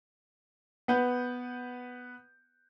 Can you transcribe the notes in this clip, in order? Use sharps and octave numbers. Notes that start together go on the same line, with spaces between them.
B3 B4 F#5 G6